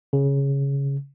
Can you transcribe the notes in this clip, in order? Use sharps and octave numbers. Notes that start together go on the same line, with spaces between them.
C#3